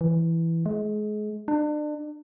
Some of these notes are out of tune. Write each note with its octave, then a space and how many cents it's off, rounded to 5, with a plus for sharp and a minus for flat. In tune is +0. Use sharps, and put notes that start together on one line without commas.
E3 +5
G#3 +30
D4 +35